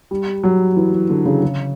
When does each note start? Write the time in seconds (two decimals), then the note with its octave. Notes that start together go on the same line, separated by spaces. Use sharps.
0.11 G3
0.44 F#3
0.76 E3
0.92 E3
1.10 D3
1.26 C#3
1.43 C#3